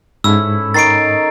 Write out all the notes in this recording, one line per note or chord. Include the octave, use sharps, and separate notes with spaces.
G#2 C#4 E4 A4 E6
D#3 D#4 C#5 A6 C7 D7